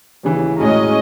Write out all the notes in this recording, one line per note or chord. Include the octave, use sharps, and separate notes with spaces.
D#2 C#3 E3
A2 G#3 C#4 F#4 D#5 A#5